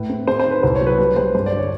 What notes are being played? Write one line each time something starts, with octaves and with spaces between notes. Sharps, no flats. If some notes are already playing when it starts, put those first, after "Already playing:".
Already playing: A2 B4
C4
C4 C5
C5
D#3
B4
C2 C5
C#5
F#3
B4
G3 B4
G3 C5
G2 C5
D5
D3
C#5